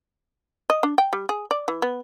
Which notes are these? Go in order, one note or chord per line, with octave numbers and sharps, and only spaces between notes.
D#5
D4
G5
G3
G#4
D5
E3
B3